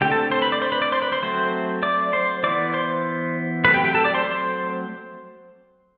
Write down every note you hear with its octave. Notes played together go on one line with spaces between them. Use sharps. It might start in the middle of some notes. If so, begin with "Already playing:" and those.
D3 A3 C4 G4 G5
A4 A5
C5 C6
B4 B5
D5 D6
C5 C6
B4 B5
D5 D6
C5 C6
B4 B5
C5 C6
F#3 A3 C4 C5 C6
D5 D6
C5 C6
E3 B3 D5 D6
C5 C6
F#3 A3 C4 B4 B5
G4 G5
G4 G5
A4 A5
D5 D6
C5 C6
C5 C6